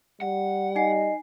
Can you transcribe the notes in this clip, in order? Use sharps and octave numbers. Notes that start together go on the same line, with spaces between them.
G3 F#5
D#4 D#5 G#5 C7